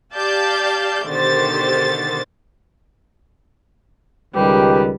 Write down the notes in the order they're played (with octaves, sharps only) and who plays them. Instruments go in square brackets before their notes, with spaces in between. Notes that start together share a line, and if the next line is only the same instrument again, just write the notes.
[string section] G4 D5 F5 A5 G6
B2 D3 D#3 G4 C5 A6
[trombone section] C#2 D#3 B4 [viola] G3 [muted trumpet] G4